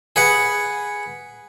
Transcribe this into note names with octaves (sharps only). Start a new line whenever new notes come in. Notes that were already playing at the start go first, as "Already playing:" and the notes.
G#4 B4 F#5